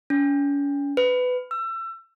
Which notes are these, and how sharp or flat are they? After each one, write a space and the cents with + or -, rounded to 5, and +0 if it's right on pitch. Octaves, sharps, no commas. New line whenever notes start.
C#4 +40
B4 +20
E6 +30